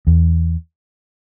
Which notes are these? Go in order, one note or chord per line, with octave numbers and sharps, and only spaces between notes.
E2